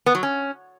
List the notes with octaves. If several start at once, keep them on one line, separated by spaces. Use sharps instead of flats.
B3
F#3
C#4